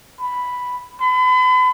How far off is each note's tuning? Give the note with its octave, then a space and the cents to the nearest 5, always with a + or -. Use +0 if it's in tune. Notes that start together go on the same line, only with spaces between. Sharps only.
B5 +0
B5 +40